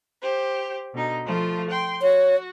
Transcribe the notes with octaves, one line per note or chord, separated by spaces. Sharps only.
G4 C5
B2 D3 D#4
F3 A3 F4
G5 C6
F#4 C#5